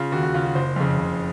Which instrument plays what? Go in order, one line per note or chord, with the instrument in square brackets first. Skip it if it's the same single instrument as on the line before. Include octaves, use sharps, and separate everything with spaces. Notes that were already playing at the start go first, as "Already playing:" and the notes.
Already playing: [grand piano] C#3 F4
D#2 F#4
F#4
C#3 F4
F#4
F#1 C5
F2 C#3
F#1